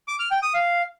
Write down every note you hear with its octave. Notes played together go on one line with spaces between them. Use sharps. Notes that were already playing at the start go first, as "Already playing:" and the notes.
D6
F6
G5
D#6
F5